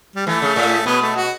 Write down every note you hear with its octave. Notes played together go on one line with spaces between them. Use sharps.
G3
E3 A3
C#3
A2
B2 B3
A3
F#4